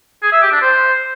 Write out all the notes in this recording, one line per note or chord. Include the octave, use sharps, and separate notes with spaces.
G#4
E5
G4
D4
C5